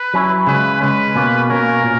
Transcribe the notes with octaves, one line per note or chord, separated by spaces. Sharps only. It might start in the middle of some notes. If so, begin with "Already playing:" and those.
Already playing: B4
F#3 C#4 E4
C#3 G#3 C#4 B4
C#3 G#3 C#4 B4
B2 A#3 C#4
B2 A#3 C#4 A#4
A#2